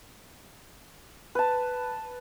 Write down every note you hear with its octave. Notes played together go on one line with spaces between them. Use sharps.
B4 A5